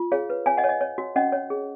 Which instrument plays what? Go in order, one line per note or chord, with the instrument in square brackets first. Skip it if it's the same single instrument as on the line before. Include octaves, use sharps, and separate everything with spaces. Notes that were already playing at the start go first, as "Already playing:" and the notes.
Already playing: [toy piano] F4
G#4 C#5 F5
B4
C#5 F5 G#5
D#5 F#5
C#5
D#5
C#5
F#4
C#4 D#5 F#5
C#5
G#4